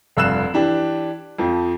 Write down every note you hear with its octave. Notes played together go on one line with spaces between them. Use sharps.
F1 G2 E6 F#6 E7
E3 D4 G4
F2 F3